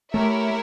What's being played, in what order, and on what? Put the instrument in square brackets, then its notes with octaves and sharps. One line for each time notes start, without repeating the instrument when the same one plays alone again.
[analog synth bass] A3 [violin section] E4 G4 A#4 C#5 E5